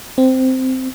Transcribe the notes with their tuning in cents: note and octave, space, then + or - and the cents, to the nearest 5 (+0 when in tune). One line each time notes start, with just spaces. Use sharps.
C4 -10